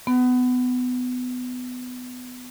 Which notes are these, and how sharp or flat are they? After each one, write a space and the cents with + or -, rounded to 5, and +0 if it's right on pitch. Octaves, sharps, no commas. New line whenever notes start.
B3 +20